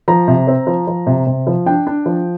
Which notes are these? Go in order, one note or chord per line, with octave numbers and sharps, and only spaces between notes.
F3 A#5
C3
C4
F3
F3
C3
C3
F3
D4 G5
D4
F3